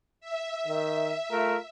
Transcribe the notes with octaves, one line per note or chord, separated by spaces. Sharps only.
E5
D#3
A3 F4 A#4